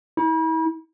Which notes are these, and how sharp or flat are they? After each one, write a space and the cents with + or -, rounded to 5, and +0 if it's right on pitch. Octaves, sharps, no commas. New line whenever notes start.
E4 -40